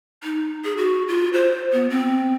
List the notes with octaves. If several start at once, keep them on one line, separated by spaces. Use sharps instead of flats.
D#4
G#4
F#4
F4
C5
B3
C4